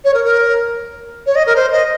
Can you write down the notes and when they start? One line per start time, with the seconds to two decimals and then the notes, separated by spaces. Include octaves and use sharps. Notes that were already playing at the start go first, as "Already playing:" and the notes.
0.04 C#5
0.14 A#4
0.24 A#4
1.26 C#5
1.35 D#5
1.46 A#4
1.56 C5
1.72 D#5